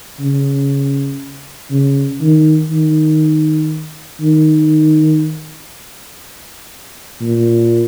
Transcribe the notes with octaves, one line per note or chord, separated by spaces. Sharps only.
C#3
C#3
D#3
D#3
D#3
A#2